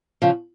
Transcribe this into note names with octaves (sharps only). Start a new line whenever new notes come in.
C#3 F3